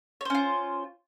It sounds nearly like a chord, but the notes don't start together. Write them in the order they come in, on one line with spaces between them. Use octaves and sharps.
C#5 C5 C#4 F4